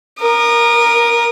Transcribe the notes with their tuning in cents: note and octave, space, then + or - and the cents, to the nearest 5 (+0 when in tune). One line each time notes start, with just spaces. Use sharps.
A#4 +10 D#6 -35